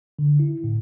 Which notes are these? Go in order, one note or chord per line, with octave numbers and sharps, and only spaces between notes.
D3
E4
A2